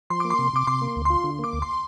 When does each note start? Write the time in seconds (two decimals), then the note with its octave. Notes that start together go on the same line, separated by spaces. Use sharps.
0.10 F3 C6
0.20 A#3 D6
0.30 C6
0.39 C3
0.53 C3 D6
0.67 C3 C6
0.81 A#3
0.96 D2
1.05 F4 C6
1.24 D3
1.39 A#3 D6
1.53 D2
1.62 C6